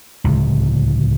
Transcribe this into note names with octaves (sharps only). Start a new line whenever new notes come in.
D1 C#2